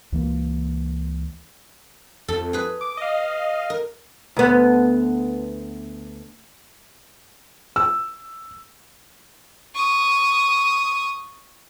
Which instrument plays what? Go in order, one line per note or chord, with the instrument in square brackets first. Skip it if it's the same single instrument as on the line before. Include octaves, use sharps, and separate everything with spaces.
[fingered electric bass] C#2 E3 A#3
[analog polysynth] F2 [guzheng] A4
[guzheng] G#4 B4
[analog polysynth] D6
D#5 F5
[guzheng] A#4
[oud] D2 B3
[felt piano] E6
[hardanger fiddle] C#6 D#6